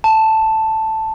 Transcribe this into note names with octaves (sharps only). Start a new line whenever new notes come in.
A5